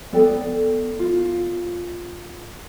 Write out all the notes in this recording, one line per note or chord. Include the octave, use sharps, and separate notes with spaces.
B3 A4 D5 G5
F4